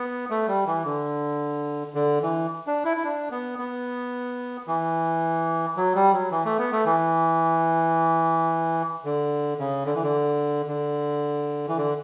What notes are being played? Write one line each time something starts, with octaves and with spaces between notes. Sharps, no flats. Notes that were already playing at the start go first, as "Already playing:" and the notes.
Already playing: B3
A3
G3
E3
D3
D3
E3
D4
E4
E4
D4
B3
B3
E3
F#3
G3
F#3
E3
A3
B3
A3
E3
D3
C#3
D3
E3
D3
D3
E3
D3